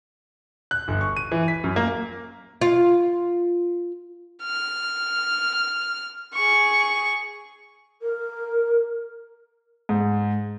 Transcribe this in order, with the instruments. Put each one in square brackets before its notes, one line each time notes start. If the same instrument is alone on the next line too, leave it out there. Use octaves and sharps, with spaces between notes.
[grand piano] F#6
G1
C#6
D#7
E3
B6
F#2
A#3
[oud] F4
[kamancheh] F6
G#4 C#6
[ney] A#4
[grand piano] G#2